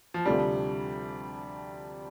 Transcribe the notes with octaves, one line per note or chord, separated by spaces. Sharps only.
F3
D2 C3 F3 G3 A3 D4